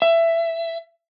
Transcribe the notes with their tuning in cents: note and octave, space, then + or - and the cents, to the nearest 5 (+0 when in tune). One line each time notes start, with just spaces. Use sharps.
E5 +15